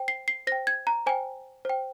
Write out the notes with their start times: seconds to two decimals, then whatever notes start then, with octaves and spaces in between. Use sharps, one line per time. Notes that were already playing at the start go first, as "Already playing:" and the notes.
Already playing: C5 G5
0.08 C7
0.28 C7
0.47 C5 G5 A#6
0.67 G#6
0.87 A#5
1.06 C5 G5 G#5
1.65 C5 G5